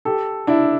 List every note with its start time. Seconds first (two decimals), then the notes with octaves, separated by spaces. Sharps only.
0.05 G4 A4
0.47 D4 E4